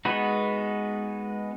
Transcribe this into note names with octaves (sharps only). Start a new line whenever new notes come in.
G#3 B3 D#4 F#4 B4